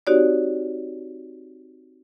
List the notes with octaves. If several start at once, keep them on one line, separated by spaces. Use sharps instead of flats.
C4 D#4 F#4 G4 C#5 D5